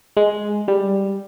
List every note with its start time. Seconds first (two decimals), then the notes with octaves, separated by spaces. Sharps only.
0.17 G#3
0.68 G3